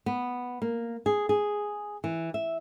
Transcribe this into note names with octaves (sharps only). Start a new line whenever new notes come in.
B3
A#3
G#4
G#4
E3
E5